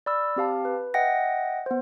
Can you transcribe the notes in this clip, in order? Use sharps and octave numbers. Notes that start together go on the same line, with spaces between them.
D5 B5 E6 F6
C4 G4 F5 A5
B4
D#5 E5 F#5 G5 A#6
B3 C5